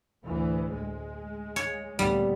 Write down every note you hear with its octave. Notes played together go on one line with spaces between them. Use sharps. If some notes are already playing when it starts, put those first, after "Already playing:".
D2 A2 E3
G#3
C#5
D2 A#2 G3 B3